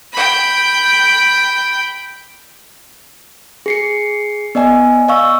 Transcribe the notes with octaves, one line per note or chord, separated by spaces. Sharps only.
G5 B5
G#4 C7 C#7
B3 D5 D#5 G#5
D5 D#5 F5 C#6 E6